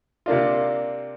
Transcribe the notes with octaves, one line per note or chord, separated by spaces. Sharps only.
C3 A#3 D4 F4